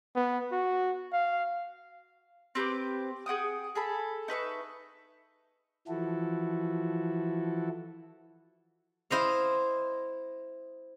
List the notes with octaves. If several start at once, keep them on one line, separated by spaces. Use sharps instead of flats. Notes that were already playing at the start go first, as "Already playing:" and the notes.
B3
F#4
F5
C4 G4 B4 D6
G#4 F#5 G5 D#6
G#4 A4 B5
D#4 B4 E5 C#6
E3 F3 E4 F#4 A4
E4 C5 D#5 F5